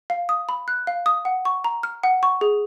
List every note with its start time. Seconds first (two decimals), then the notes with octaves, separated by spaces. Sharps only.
0.10 F5
0.29 D#6
0.49 B5
0.68 F#6
0.87 F5
1.06 D#6
1.25 F#5
1.45 C#6
1.64 A#5
1.83 F6
2.03 F#5
2.23 C#6
2.41 G#4